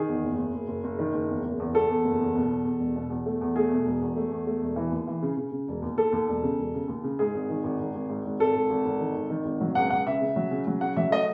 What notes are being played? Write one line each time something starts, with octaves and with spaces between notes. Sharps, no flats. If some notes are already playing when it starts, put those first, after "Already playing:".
Already playing: D#3 G#4
E2
F#1
F#1
F#1
F#1
F#1
D#3
F#1
E2
F#1
E2
E2 A4
E2
F#1
E2
B2
E2
E2
E1
B2
E2
A3
E2
A3 G#4
B2
E1
E2
A3
E2
A3
E1
E3
D#2
E3
C#3
C#3
C#3
E1
D#2
D#2 A4
D#2
E1
C#3
E1
C#3
D#2
C#3
G#2 G#4
G#1
D#3
G#1
G#1
G#1
G#2
G#1
G#1 A4
G#1
G#1
G#1
D#3
G#1
D#3
G#1
F#3
C#2 F#5
C#2 F#5
C#3 E5
C#3
F#3
C#3
F#3
C#3 F#5
F#3 E5
A3 D#5